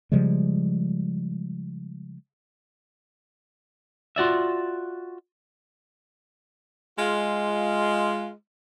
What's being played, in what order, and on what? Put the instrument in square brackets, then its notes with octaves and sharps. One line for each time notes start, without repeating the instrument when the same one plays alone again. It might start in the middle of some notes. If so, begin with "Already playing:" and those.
[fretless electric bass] C#3 F3 G3 G#3
[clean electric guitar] F4 F#4 D5 E5
[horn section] G#3 F4